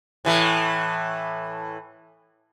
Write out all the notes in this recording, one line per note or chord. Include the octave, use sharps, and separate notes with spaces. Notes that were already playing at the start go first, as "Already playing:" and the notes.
A2 E3 A3